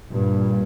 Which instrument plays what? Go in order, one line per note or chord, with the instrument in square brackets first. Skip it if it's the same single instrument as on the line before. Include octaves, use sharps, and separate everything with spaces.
[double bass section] G2 A#2